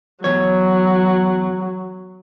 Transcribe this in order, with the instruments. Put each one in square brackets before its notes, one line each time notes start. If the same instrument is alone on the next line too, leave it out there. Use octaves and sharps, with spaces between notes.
[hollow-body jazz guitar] E2 C#5 [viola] F#3